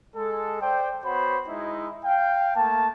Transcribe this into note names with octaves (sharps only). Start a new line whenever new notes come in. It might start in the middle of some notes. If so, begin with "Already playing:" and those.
G#3 A4
C5 D5 G5
B3 F#4 C5 C#5 B5
G#3 D#4 E4
F5 G5
A3 A#3 A5